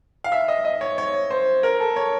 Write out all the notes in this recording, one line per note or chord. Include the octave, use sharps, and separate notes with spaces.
F5
E5
D#5
D#5
C#5
C#5
C5
A#4
A4
C#5